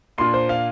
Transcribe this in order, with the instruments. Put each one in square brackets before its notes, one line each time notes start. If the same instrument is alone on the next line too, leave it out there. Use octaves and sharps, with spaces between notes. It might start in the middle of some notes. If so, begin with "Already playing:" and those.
[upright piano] A#2 A#3 D4 F4 [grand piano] C6
[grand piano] C5
F5